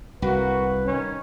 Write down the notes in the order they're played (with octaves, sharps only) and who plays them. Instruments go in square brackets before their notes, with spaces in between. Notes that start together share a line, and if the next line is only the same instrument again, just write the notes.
[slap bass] C2 [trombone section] A#3 F#4 [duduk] B4
[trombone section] D#3 C#4